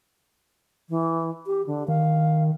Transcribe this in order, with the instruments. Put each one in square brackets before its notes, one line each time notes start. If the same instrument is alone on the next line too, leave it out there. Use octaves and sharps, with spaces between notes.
[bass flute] E3
G4
D3
[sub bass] D#3 [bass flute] F5